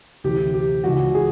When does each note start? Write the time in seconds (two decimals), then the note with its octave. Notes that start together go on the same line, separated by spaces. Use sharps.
0.24 D2 C3 E3 G4
0.54 G4
0.84 C#2 C#3 E3 F#4
1.15 G#4